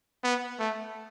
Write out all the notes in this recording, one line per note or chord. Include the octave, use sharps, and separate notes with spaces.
B3
A3